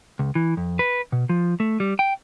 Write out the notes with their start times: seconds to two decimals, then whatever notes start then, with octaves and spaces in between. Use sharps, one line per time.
0.19 C#2
0.35 E3
0.57 F2
0.79 B4
1.12 B2
1.29 F3
1.60 A3
1.80 G3
1.99 G5